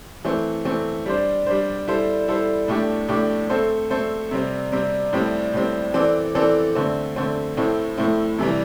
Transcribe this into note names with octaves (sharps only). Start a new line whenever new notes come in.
E3 A3 C4
E3 A3 C4
G3 D4 C5
G3 D4 C5
G3 E4 A4 C5
G3 E4 A4 C5
A2 A3 D4 G4
A2 A3 D4 G4
A3 C4 A4 C5
A3 C4 A4 C5
C3 G3 C4
C3 G3 C4
A2 G3 C4
A2 G3 C4
E3 C4 A4 D5
E3 C4 A4 D5
D3 A3 C4
D3 A3 C4
A2 A3 C4 E4
A2 A3 C4 E4
C3 E3 G3